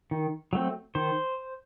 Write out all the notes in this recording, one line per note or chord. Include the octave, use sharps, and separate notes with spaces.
D#3
F#3 A3 C4
D#3 C5